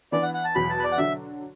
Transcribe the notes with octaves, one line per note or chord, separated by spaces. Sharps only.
E3 B3 D4 D5
F#5
F#5
A5
E2 B2 F#3 B5
A5
B4
D5
F#5
D3 F#3 D4 F#4 E5